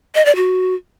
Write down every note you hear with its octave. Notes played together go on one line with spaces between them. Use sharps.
D#5
D5
F#4